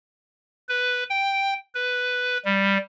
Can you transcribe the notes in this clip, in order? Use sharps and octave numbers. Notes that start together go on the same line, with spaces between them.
B4
G5
B4
G3